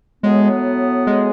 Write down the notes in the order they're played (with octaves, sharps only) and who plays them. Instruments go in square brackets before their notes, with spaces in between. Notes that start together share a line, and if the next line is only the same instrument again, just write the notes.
[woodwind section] A2 F#3 B3 [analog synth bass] G#3
[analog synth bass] G#3